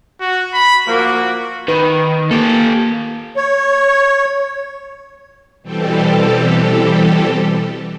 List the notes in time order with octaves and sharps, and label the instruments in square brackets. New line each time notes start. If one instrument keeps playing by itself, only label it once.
[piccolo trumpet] F#4
B5
[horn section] F3 A#3 [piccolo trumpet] F#4
[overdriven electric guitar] D#3 [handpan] B4
[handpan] A#3 [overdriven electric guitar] G4 A4
[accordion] C#5
[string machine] B2 E3 G3 C4 G4 A4